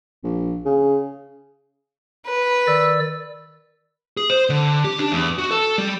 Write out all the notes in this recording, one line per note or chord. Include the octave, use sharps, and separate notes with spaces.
A#1
C#3
B4
D#3 D5 E6
G#4
C5
D3
G4
D4
E2
F#4
A4
G3